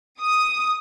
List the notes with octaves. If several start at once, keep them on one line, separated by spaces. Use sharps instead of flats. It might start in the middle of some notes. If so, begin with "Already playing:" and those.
D#6